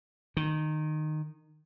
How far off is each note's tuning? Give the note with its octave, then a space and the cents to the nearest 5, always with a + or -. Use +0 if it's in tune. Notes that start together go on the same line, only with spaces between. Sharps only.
D#3 -15